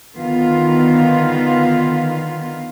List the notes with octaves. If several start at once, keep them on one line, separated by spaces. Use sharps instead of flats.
D3 D#3 B3 F4